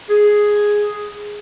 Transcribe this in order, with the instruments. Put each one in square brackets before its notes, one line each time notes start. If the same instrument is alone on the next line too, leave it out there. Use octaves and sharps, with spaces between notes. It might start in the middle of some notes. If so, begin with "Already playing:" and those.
[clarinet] G#4